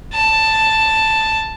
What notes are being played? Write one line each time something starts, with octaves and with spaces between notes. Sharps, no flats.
A5